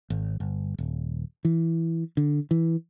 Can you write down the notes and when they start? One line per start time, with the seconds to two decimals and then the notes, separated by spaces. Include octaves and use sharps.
0.10 G#1
0.40 G1
0.78 D#1
1.45 E3
2.17 D3
2.51 E3